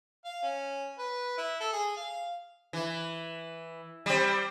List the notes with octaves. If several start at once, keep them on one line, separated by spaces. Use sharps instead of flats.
F5
C#4
B4
E4
A4
G#4
F5
E3
G3 C4